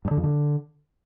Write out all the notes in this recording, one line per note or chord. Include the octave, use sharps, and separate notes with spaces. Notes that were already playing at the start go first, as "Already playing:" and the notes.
G2
D3
F2
D3